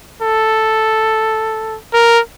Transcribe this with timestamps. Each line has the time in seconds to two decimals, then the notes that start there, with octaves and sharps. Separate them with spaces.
0.22 A4
1.93 A#4